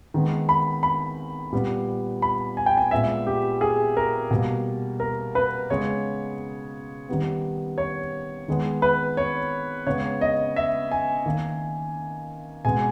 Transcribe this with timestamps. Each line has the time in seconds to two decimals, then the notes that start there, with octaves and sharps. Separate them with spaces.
0.14 D#3 G#3 B3
0.49 B5
0.83 B5
1.52 A#2 G3 B3
2.22 B5
2.57 G#5
2.66 G5
2.77 G#5
2.91 A#2 G#3 B3 E5
3.27 G4
3.61 G#4
3.97 A#4
4.31 B2 G3 A#3
5.00 A#4
5.35 B4
5.70 C#3 G#3 B3 C#5
7.09 D#3 G3 B3
7.78 C#5
8.48 D#3 G#3 B3
8.82 B4
9.17 C#5
9.87 C#3 G#3 B3 C#5
10.21 D#5
10.56 E5
10.92 G#5
11.26 D#3 A#3
12.65 B2 G#3 B3 G#5